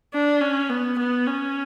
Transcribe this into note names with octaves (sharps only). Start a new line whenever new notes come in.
D4
C#4
B3
B3
C#4